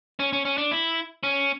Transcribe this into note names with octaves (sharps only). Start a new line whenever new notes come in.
C#4
C#4
C#4
D4
E4
C#4